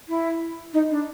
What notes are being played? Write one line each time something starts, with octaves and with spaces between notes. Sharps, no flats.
E4
D#4
D4